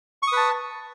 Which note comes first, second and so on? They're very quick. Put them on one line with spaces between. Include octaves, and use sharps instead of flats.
C#6 D#6 B4 A5